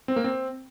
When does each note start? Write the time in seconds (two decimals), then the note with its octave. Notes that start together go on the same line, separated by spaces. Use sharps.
0.08 C4
0.16 A#3
0.24 C4